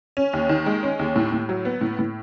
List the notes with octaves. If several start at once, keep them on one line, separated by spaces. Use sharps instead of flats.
C#4
D#2
D#3
G#3
C#4
D#2
A2
A2
F#3
B3
A2
A2